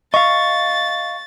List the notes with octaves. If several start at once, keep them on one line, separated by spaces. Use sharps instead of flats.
D#5 F5 C#6 A6